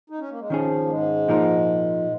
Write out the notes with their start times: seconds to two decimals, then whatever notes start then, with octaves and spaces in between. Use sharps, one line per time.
0.10 D#4
0.20 C#4
0.30 A#3
0.40 G#3
0.50 D#3 F3 C#4 G#4
0.85 A#3
0.89 G#2 G#3
1.28 A#2 F3 A#3 D#4 A#4